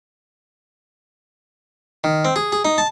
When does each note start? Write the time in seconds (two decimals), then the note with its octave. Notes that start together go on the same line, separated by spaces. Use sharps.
2.04 D#3
2.25 C4
2.36 G#4
2.52 G#4
2.65 D#4
2.78 A5